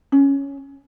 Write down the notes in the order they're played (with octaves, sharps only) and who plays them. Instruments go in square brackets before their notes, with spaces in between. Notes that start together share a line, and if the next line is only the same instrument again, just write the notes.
[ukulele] C#4